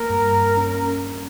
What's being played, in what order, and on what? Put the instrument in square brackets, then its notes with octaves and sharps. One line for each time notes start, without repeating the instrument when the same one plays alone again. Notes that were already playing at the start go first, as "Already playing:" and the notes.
Already playing: [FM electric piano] A#3 [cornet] A#4
[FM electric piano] G2
C#4